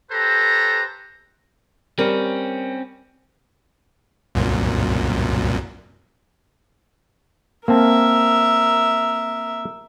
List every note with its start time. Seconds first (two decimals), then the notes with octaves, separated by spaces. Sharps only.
0.11 G4 A4 B4 C5 A#5
1.99 G3 C4 C#4 A#4
4.35 C2 F#2 A#2
7.68 A#3 C4 A#4 E5 A5